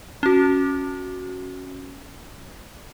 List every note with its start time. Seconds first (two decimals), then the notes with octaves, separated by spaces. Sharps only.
0.23 C#4 F#4